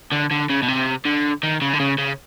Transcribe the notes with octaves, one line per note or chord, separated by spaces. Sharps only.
D3
D3
C#3
B2
C3
D3
D#3
C#3
D3
C#3
C#3